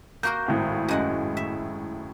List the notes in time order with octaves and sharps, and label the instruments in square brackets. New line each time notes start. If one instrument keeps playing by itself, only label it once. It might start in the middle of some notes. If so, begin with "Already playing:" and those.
[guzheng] A#3 F#4 A#4 [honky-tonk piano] G6
[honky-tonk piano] G#1 A2 F5
[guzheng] F#2 G#3 F#5
E5